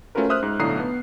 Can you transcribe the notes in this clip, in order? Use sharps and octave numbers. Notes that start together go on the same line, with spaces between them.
A3 C#4 F4 F#4 A#4 B4
C5 E5 D#6 F6 F#6
G#2
B1 A2 D3 A#5 D#6 C7
B3